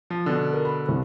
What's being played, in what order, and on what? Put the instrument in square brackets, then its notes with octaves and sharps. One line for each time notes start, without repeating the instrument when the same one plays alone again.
[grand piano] F3
B2 D3
[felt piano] A#4
B5
C2